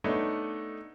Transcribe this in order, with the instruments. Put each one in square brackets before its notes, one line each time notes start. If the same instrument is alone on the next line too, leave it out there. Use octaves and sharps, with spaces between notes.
[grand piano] A3 B3 D4 D#4 C#5